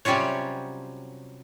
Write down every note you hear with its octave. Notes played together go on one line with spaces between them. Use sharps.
C3 F#3 G3 C#4 F4 C#5